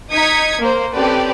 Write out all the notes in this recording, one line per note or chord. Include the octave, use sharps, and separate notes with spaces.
D#4 D#6 G#6 B6 C#7
A#3 C5
C4 C#4 G4 A4 B4 D5